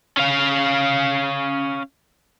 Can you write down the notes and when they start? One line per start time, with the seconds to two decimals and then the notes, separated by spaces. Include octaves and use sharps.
0.17 C#4 F5